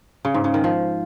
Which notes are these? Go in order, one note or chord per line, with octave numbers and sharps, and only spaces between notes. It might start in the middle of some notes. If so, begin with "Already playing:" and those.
C#3
G#2
C#3
D#3
F3